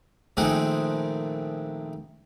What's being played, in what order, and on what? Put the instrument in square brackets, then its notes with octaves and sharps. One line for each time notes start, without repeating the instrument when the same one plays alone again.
[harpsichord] A#1 D#3 A3 C4 G#4 F#5